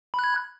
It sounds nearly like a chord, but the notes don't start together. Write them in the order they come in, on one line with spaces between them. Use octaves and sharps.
B5 F#6 G#6